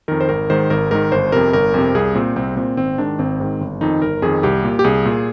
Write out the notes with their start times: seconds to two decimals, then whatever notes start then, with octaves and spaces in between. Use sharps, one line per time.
0.08 F2 D#3 A#4
0.21 C5
0.29 G#1 A#4
0.50 G#2 D#3 C5
0.70 G#1 A#4
0.91 G#2 D#3 A#4
1.12 G1 C5
1.32 F2 C3 A#4
1.53 G1 A#4
1.74 F2 C3
1.95 C2 G#4
2.15 A#2 C4
2.36 C2 C4
2.57 A#2 C4
2.77 G#1 C4
2.98 G#2 D#3 D4
3.19 G#1 C4
3.40 G#2 D#3
3.61 G1
3.81 F2 D#3 D#4
4.02 G1 A#4
4.22 F2 D#3 G#4
4.43 C2 G4
4.64 A#2
4.79 G4
4.84 C2 G#4
5.05 A#2